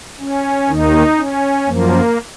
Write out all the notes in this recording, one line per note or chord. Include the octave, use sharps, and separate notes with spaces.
C#4
D#2 D#3 D#4
C#4
F#2 F3 A#3